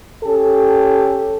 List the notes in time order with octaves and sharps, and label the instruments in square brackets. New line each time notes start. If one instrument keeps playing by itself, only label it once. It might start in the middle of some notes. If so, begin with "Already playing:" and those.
[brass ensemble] C#4 G4 A4